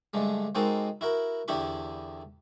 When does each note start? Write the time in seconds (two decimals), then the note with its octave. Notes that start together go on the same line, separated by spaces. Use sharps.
0.14 G2 D3 G#3 A3
0.55 G#3 A#3 C4 D#4 F#4 A4
1.01 E4 F#4 A#4
1.48 E2 D3 E4 G4 B5 C#6